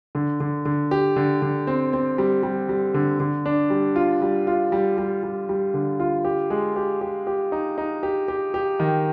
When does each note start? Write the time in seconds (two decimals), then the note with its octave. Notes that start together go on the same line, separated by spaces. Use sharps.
0.15 D3
0.40 D3
0.65 D3
0.91 G4
1.16 D3
1.42 D3
1.67 C4
1.93 C4
2.18 G3
2.43 G3
2.69 G3
2.94 D3
3.20 D3
3.46 D4
3.70 G3
3.96 F4
4.22 G3
4.47 F4
4.72 G3
4.98 G3
5.23 G3
5.49 G3
5.74 D3
6.00 F4
6.25 G4
6.50 G#3
6.76 G4
7.01 G4
7.27 G4
7.52 D#4
7.78 D#4
8.03 G4
8.28 G4
8.54 G4
8.80 D#3